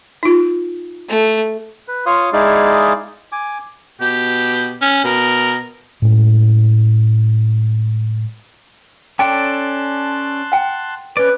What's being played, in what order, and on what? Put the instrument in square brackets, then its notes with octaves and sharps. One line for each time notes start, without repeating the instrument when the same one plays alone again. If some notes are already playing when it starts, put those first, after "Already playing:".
[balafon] D#4 F4
[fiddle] A3
[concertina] B4
F4 C#5 F5 C6 D#6
G#3 D#4 E4 G#4 D5 F5
G#5 D6
[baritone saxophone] B2 [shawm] G4
[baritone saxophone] C#4
[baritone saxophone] B2 [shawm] A#4
[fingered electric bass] A2 G#3 C#4
[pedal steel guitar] C#4 A4 D5 [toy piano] G5 [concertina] A5 C6 F#6
[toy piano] F#5 G5
[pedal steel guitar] C#4 D5 [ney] B4